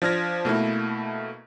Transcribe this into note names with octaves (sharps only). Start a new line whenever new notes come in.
F3 D4 F6 G#6 A#6
B2 A3 A#3 E4